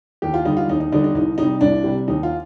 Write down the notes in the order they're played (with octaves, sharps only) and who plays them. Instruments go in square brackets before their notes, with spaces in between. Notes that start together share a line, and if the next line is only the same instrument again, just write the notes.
[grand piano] D#2 G4
F4
D3 G3 D#4
F4
D#2 D#4
D#4
D3 G3 D#4
D#4
C2 D#4
C3 G3 D#4
C2 D4
C3 G3
D#2 D#4
F4